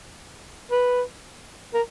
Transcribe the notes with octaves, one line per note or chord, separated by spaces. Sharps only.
B4
A#4